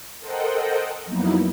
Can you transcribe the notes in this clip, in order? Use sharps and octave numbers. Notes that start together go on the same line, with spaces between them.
A4 A#4 C5 D#5 F#5 G5
F2 F#3 A#3 B3 D#4 E4